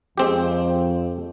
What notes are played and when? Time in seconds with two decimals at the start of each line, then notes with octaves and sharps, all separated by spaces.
0.18 F2 G#3 C4 G4